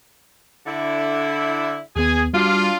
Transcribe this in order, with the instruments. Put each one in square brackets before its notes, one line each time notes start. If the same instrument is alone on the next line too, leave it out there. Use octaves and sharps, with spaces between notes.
[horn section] D3 E4
[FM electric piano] D#2 B3 [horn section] G#4
[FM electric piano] G3 F#4 [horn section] D4 F4